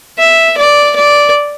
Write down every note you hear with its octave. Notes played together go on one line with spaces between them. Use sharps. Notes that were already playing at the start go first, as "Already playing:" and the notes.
E5
D5
D5